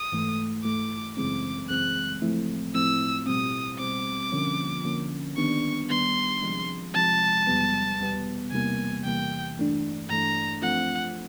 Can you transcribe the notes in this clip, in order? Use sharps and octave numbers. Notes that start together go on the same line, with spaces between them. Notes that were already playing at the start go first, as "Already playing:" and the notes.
Already playing: D#6
G#2 E3 A3
G#2 E3 A3 D6
F#2 C#3 E3 G#3 C4 D6
F#2 C#3 E3 G#3 C4 F#6
A2 F3 A3 C4 E4
A2 F3 A3 C4 E4 E6
B2 G3 C4 D#6
B2 G3 C4 D6
D3 F3 A#3 C#4
D3 F3 A#3 C#4
D#3 G3 B3 D4 C#6
D#3 G3 B3 D4 C6
C3 F3 G#3
C3 F3 G#3 A5
E2 B2 G3 B3
E2 B2 G3 B3
E2 C3 E3 G3 A#3 G#5
E2 C3 E3 G3 A#3 G5
G2 E3 A3 D4
G2 E3 A3 D4 A#5
F3 A3 C4 F4 F#5